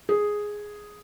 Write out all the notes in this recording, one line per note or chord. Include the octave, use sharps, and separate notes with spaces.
G#4